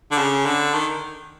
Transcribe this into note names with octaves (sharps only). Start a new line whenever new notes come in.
D3
C#3
D3
D#3